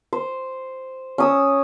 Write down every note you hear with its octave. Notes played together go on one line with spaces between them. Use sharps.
C5
C#4 D#6 E6